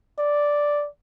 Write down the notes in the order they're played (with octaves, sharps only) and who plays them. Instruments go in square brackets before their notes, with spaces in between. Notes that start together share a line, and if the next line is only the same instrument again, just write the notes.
[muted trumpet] D5